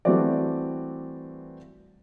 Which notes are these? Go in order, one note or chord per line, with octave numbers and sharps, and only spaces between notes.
E3 G3 A3 C4 F#4 D5